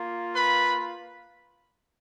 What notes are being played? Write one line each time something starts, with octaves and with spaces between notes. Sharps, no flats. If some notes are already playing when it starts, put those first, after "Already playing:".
Already playing: A#3 F4
B4 B5